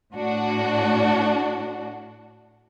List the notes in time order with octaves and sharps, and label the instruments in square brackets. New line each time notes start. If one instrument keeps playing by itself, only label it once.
[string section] A2 D4 F#4